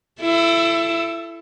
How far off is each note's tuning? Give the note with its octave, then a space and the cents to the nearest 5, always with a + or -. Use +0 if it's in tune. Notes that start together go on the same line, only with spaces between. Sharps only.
E4 +25 A4 +0